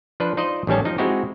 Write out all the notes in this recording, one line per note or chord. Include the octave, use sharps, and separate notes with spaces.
F3 D4 B4 C5
D#4 F4 C5 D5 D#5
A1 D#3 G3 C#4 A5
F3 D#4
G#3 C4 D#4 E4 F#4 G4